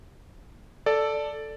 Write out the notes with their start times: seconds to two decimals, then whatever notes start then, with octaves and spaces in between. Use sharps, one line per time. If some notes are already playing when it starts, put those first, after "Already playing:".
0.86 A4 D5